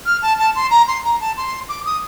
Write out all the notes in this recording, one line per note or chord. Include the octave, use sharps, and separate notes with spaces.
F6
A5
A5
C6
A#5
C6
A#5
A5
C6
D6
D#6